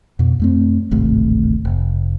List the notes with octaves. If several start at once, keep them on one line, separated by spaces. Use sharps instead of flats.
F2 B2
F2 A3 C4
D1 G#1 C3 A3
F1